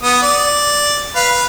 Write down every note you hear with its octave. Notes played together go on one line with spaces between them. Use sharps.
B3 D#6
D5
B4 F5